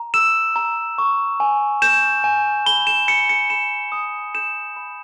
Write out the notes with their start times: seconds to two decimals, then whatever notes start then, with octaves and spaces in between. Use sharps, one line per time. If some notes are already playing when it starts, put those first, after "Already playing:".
Already playing: A#5
0.14 E6 E7
0.56 A#5
0.98 C#6
1.40 G#5
1.82 G6 E7
2.24 G#5
2.66 B5 G7
2.87 E7
3.08 B5 C#7
3.29 C#7
3.50 B5 E7
3.92 D#6
4.35 G6 E7
4.77 B5